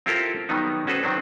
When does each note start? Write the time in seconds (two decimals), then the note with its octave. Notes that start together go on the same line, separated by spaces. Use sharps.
0.06 C4 E4 F4 G4 A4 A#4
0.49 D#3 F#3 G3 B3 D#4
0.87 C#4 F#4 A4 B4 C5
1.03 D#3 F#3 C4 D4